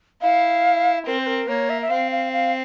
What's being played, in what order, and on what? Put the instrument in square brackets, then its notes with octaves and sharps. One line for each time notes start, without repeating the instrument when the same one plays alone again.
[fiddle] E4 [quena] F5
[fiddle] C4 [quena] A#4
[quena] C5
A#4
[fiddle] A#3 [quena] C#5
[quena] E5
E5
[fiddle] C4 [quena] F5
[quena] F5
F5